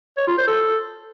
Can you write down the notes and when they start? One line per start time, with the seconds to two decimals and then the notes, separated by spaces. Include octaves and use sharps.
0.17 C#5
0.27 F4
0.37 C5
0.48 A4